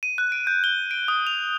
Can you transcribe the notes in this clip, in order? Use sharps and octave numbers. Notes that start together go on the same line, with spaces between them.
D#7
F#6
D7
G6
G7
D7
D#6
F7